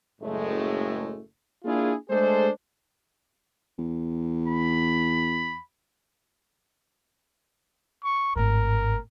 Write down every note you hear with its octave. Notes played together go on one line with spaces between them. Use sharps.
F#1 A2 G#3 A3
A#3 D4 E4 F4 G#4
G#3 A3 D4 G#4 A4 C5
E2
B5
C#6
G#1 A2 A#4